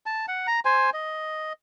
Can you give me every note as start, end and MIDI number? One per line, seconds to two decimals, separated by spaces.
0.06 0.26 81
0.28 0.47 78
0.47 0.60 82
0.65 0.90 72
0.65 0.90 80
0.94 1.53 75